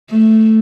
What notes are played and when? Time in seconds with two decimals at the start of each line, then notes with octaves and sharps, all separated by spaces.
0.11 A3